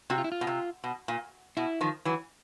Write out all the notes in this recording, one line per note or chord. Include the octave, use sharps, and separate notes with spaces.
C3 F#4
F4
E4
F4
B2
C3
B2
A#2
B2 E4
D#3 F3
E3 F#3